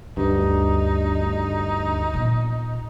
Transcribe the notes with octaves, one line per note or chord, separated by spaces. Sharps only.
D2 G2 D#4
A#2 B3